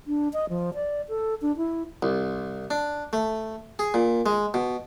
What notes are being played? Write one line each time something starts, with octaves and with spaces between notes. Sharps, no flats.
D4
D#5
F3
D5
A4
D4
E4
C2
D4
A3
G#4
A#2
G#3
B2